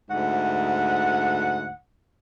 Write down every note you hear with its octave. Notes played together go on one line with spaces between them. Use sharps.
D2 G#2 F#5